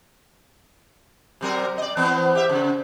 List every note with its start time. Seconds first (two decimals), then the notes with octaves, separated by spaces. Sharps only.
1.41 C3 F#3 A#4
1.78 D5 D#5
1.97 E3 B3 C4
2.35 G4 E5
2.49 C#3